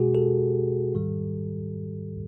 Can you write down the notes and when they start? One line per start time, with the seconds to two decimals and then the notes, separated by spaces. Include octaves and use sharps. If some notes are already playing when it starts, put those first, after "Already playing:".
Already playing: B2 G#3 F#4 G#4
0.14 G4 A4
0.94 G#2 D#3 G3